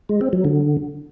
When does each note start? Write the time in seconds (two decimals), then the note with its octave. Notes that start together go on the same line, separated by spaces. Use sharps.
0.09 G#3
0.21 C4
0.33 F#3
0.45 D3